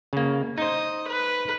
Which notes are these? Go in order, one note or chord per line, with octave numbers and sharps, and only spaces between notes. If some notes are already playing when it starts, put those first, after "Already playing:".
C#3 A#3
D#4 C5 D#5
B4